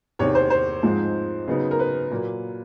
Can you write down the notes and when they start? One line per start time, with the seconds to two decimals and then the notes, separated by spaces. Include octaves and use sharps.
0.19 E2 C3 D#3 C#5
0.35 C5
0.50 C5
0.83 G#2 F3 G#3 C4 D#4
1.48 C#3 F#3 B3 D#4
1.71 A#4
1.79 B4
2.11 A#2 F#3 A#3